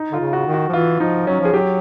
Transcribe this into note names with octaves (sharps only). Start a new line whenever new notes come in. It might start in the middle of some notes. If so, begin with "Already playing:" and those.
Already playing: D#4
D3 F4
C#3
F#4
D#3
F#4
F3
E3 F4
F3 D#4
F#3 C#4
F3 G#4
F#3 G4